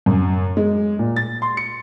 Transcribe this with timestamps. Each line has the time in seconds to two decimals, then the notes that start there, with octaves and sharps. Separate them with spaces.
0.06 F#2
0.57 G#3
0.99 A#2
1.16 A6
1.42 C6
1.57 C#7